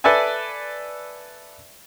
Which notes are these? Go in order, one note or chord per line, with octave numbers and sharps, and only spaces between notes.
A4 B4 D5 E5 G#5